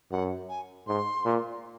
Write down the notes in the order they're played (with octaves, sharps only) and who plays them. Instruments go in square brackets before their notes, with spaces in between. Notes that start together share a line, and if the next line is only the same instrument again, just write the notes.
[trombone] F#2 [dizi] F#5
[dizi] G#5
[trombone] G#2 [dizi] C6
[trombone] A#2